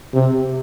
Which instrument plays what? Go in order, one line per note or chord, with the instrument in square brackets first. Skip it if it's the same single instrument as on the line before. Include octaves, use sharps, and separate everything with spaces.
[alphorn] C3